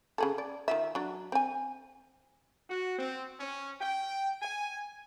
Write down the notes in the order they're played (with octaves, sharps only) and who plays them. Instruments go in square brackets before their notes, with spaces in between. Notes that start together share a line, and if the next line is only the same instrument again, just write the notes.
[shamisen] C#3 G#4 A4
D5
D#3 F4 E5
F#3 D4
C4 G#5
[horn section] F#4
C4
C#4
G5
G#5